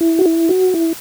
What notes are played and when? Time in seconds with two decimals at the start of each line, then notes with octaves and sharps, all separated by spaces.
0.01 E4
0.19 F#4
0.26 E4
0.49 F#4
0.74 E4